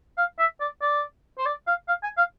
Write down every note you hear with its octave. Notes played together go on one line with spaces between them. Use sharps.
F5
E5
D5
D5
C5
D5
F5
F5
G#5
F5